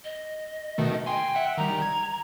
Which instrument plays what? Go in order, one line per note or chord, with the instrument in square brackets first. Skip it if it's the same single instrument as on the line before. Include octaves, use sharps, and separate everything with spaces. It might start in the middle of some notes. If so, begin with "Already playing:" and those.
[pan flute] D#5
[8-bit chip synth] B2 D#3 A3
[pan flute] G5 [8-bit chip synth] G#5 C6
[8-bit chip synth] E5 F#5
[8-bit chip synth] D#3 G3 [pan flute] A#5
[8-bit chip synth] G#6